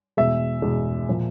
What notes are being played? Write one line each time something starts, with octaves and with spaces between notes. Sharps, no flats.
E2 B2 G#3 E5
E2 B2 G#3
A#2 F3